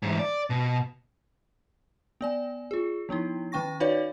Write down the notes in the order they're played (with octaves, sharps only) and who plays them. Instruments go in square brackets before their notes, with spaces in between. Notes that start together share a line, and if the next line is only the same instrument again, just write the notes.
[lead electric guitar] G#2 E3
D5
B2
[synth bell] B3 D5 G#5
F4 G#4
F3 B3 D#4 E4
D#3 C#4 G5 C#6 A#6
D#4 F#4 B4 C#5 D5 F5